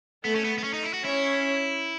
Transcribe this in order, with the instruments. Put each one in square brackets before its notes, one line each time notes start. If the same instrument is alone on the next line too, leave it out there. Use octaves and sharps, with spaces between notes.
[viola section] A3 A4 [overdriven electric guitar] B3
[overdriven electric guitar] C#4
B3
B3
C#4
D#4
E4
F#4
[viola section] C#4 C#5 [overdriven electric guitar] E4